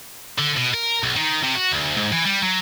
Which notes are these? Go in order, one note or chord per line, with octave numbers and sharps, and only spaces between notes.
D3
B2
A#4
B1
D#3
C3
F#4
D2
G#2
E3
G3
F#3